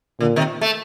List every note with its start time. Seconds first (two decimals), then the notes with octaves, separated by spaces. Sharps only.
0.20 A#2 D3
0.36 C3 D#3
0.61 A3